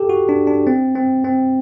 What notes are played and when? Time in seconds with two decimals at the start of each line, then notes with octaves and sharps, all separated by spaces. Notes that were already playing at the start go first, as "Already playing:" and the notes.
Already playing: G4 A4
0.09 F#4
0.29 D4
0.47 D4
0.67 C4
0.96 C4
1.24 C4